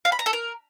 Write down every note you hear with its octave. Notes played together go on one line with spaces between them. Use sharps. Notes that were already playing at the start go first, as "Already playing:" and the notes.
F5
B5
A#5
A4
A#4